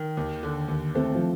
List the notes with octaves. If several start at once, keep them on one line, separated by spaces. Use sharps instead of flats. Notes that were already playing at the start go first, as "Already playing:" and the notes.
Already playing: D#3
D#2
D3
D#2
A3 C4
F3